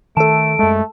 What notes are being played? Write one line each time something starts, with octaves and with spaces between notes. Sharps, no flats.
D#3 A3 A4 A5 D7
F#2 G#3 A3